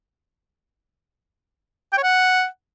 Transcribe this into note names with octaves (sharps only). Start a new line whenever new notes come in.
G5
C#5
F#5